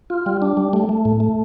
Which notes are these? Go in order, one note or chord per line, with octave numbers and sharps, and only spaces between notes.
F4
G3
D4
G3
A3
A3
A2
A3